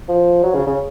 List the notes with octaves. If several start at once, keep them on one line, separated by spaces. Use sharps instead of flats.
F3
F#3
C#3
C#3